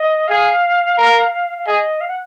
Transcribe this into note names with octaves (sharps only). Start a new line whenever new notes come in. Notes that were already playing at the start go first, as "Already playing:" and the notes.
Already playing: D#5
G#4 F5
A#4
F5
G#4 D#5
F5
F#5